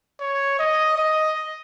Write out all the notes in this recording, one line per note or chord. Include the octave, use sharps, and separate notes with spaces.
C#5
D#5
D#5